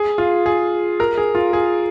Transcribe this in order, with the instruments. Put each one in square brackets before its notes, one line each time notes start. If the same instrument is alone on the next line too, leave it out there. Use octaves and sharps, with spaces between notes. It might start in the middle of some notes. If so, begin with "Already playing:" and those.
Already playing: [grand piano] G#4
F4
G#4
A#4
G#4
F4
G#4